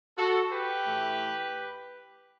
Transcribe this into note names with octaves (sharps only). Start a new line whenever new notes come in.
F#4 A4
G4 B4
A2 E3 A3